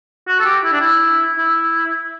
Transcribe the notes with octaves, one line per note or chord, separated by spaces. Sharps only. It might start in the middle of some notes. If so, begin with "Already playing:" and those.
F#4
A4
G4
E4
D4
E4
E4